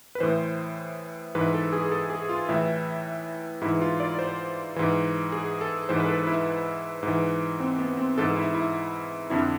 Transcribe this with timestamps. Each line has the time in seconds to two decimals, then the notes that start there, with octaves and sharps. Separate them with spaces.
0.15 B4
0.20 A2 E3 C5
1.35 G#2 E3 B4
1.54 A4
1.73 G#4
1.91 A4
2.10 G#4
2.29 F4
2.49 A2 E3 E4
3.61 G#2 E4
3.66 E3
3.82 F4
4.00 D5
4.19 C5
4.76 G#2 E3
5.32 G#4
5.61 A4
5.89 G#2 E3 C5
6.00 B4
6.08 A4
6.27 E4
7.03 G#2 E3
7.60 C4
7.79 B3
7.97 C4
8.18 G#2 E3 A4
8.36 E4
8.55 E4
9.30 F2 D3 E4